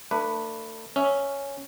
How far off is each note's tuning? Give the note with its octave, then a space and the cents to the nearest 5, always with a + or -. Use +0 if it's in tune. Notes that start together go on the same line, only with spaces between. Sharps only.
A3 +40 D4 +35 B4 +0
C#4 +0 E5 -10